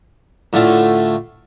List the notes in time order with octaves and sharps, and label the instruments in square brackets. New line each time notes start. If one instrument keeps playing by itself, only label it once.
[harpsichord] A2 D3 A3 F4